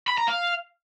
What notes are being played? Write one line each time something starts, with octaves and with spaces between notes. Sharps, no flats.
B5
A#5
F5